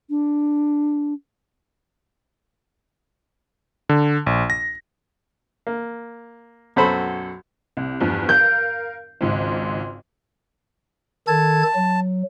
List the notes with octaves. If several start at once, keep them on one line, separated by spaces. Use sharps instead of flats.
D4
D3
A#1
A#6
A#3
B1 F#2 F#4 A4 C5 B5
C2
E2 G2 F3
A#4 F5 G6
G#1 C#2 G#2
D#3 A4 A5 G#6
F#3